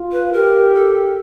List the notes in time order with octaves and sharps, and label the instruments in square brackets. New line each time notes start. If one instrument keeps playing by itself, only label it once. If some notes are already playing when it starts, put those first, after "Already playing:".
Already playing: [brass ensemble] F4
[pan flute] B4
[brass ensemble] G4 [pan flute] A#4
[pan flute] A4